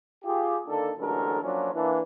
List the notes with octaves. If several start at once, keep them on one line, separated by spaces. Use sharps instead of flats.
F4 G4 G#4
D3 D#3 A#3 D4 A4
A1 D3 F#3 G#3 A4 A#4
F3 F#3 A#3 C#4 D4 F4
E3 A#3 D4